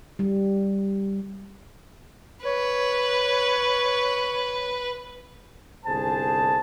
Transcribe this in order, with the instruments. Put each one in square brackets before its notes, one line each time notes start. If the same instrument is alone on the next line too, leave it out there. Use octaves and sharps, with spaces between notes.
[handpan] G3
[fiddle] B4 [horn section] C#5
[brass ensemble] G1 C2 G#4 C5 A5